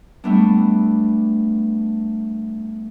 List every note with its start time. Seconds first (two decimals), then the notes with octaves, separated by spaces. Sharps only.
0.24 G3 A3 B3 D4